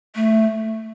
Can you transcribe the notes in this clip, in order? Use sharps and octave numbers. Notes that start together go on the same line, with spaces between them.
A3